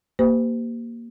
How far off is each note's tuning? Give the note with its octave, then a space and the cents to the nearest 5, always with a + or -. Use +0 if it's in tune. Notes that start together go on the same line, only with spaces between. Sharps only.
A#3 +0 G4 +0 C5 -40